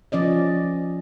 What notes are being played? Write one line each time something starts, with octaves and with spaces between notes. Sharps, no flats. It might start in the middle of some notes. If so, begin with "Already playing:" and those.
F3 C#4 D5 D#5